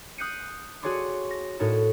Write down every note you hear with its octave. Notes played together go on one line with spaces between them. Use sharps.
D#6 F#6 G6 C7 C#7 D#7
F#4 G#4 C#5 A5 C6 D6
A#6
A2 D#4 F#4 A#4 C#5 A5